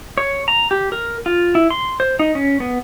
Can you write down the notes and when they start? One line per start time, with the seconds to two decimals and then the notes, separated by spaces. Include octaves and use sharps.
0.18 C#5
0.48 A#5
0.71 G4
0.92 A#4
1.26 F4
1.55 E4
1.71 C6
2.00 C5
2.19 D#4
2.35 C#4
2.60 B3